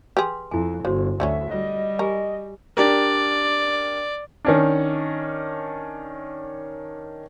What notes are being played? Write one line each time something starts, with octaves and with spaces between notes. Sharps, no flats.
G4 G#4 B4 C6
F2 E4 G#5
G1 C#3 F#4 C5
D2 D3 F#3 C#4 E5
G3 D#5
G4 A#4 G#5
D4 G4 A#4 D5
D#3 C#4 D4